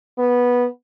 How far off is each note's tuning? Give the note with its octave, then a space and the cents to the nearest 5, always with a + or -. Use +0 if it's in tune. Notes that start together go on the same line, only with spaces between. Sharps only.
B3 -10